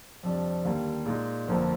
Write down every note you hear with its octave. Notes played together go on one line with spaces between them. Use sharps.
F2 C3 G3 D4
D#2 D3 G3 A#3
A#2 G#3 D#4
G1 F2 D3 F3 A#3